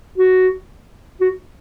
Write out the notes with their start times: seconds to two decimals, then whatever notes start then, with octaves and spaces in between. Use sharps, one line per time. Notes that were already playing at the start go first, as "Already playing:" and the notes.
0.18 F#4
1.21 F#4